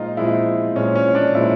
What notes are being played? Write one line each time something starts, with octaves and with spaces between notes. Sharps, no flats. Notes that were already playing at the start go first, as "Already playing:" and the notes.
Already playing: A#2 F3 G#3 D#4 F4
A#2 F3 G#3 E4
A#2 F3 G#3 C#4
C#4
D4
A#2 F3 G#3 E4